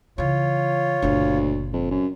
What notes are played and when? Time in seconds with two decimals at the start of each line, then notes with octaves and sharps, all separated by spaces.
0.18 C#3 E3 F4 C#5
1.02 F#1 D2 A#2
1.73 F2
1.91 F#2